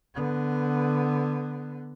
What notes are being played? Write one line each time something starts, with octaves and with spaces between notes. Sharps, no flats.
D3 B3